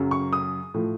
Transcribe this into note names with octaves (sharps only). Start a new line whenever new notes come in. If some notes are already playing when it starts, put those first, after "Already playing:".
Already playing: F#2 C#3 F#3
C#6
D#6
A2 F3